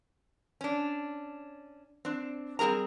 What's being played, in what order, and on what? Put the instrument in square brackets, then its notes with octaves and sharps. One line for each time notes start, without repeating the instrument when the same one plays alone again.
[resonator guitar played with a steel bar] C#4 D4
C4 D4
G3 C4 G#4 A#4 A#5